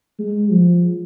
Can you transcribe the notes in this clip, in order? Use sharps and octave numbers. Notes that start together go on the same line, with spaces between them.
G#3
F3